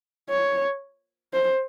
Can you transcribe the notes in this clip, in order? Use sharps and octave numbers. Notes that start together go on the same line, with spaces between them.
C#5
C5